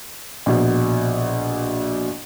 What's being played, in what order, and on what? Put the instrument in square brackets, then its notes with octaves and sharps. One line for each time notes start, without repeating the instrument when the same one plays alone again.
[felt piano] A#1 B2